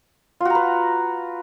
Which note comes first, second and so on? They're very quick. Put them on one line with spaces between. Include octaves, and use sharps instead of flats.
F4 F#4 A#5 B4